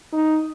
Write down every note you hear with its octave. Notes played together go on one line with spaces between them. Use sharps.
D#4